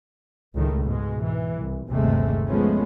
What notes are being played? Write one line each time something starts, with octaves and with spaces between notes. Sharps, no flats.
C#2 A2 D#3 A3
G#2 B2 G#3
E3
C2
G1 D#2 C3 G#3 A3
F3 G#3 A3 B3 C#4